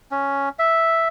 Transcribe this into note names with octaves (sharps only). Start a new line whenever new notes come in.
C#4
E5